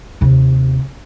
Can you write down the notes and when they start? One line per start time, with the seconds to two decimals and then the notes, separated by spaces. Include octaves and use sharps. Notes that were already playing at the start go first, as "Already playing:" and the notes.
0.21 D#2 C3